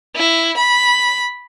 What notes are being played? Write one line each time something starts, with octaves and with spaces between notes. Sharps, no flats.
E4
B5